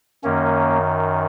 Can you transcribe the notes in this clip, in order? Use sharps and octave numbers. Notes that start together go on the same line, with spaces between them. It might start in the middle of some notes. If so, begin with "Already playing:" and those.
F#2 D#3 A#3 C#4